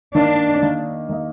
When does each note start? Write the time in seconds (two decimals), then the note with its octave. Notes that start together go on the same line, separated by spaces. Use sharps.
0.15 D#3 A#3 D4 D#4
0.62 D#3 A#3 D#4
1.09 D#3 A#3 D#4